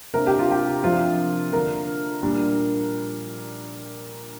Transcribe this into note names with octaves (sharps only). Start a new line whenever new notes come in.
C3 A#3 D4 A#4
G4
F4
G4
C3 F3 D4 F4
D3 A#3 D4 A#4
A#2 G3 D4